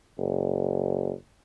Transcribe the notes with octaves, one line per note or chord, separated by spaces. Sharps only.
F#1